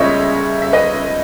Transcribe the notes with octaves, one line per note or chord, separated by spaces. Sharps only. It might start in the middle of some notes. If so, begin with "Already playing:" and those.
Already playing: C#2 C#3 G3 C#4 C#5 D#5 E5
E5
B4 D#5